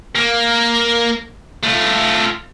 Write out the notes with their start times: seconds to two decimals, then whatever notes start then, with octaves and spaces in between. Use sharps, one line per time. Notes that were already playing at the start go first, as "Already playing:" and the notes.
0.15 A#3
1.63 A3 F4